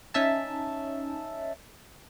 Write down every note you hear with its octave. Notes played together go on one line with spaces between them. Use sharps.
C#4 D#4 E5 A5